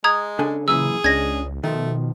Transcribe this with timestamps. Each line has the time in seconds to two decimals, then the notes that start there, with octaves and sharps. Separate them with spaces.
0.04 G#3 A#5 D#6 G#6
0.39 C#3 D4 A4 G#5
0.68 F#2 A#2 E3 G#4 E6
1.04 C#2 G#3 C#4 D4 G#6 A#6
1.64 B2 D#3 F3 A3